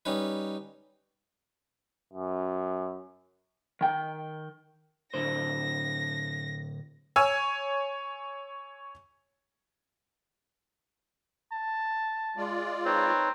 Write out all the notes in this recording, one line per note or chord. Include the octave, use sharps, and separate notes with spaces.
G3 C#4 D#4 B4
F#2
D#3 G5
A2 D3 C5 A#6
C#5 G#5 E6
A5
G#3 F4 D5
C4 D#4 B4 C#5